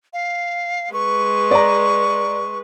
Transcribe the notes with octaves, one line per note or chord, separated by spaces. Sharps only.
F5
G#3 B4 C#6
D5 A#5